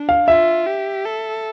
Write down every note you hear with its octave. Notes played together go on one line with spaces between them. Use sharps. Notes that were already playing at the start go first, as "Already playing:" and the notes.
Already playing: D4
F5
F4 E5
G4
A4